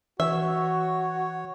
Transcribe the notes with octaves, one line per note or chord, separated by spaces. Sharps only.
E3 F#4 C#5 E5